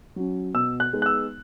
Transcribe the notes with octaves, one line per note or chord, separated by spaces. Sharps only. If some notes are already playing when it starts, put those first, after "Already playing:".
F#3 C#4
B2 E6
F#6
G#3 B3 D#4
F#6
E6